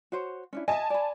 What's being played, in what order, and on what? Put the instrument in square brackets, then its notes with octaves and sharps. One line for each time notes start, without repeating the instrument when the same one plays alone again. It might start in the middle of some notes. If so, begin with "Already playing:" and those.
[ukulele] F#4 C5 C#5
C#4 D4 E4
[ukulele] D#5 E5 [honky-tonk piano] G#5 A5
[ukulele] D5 B5